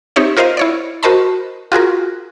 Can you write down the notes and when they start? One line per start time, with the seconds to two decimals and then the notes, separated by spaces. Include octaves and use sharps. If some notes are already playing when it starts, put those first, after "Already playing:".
0.16 C4 D#4 G4 C#5 E5
0.37 F4 A#4 C5 D#5 F5
0.57 E4 C#5 D5
1.03 F#4 A#4 C5 D#5 A5 B5
1.72 F4 F#4 G#4 A#4